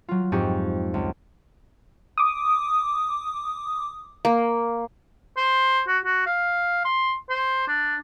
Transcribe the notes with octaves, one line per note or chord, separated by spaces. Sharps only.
F#3 F4
F2 G#2 D#4 G4 G#4 C#6
C#2
D6 D#6
A#3
C5
F#4
F#4
F5
C6
C5
D4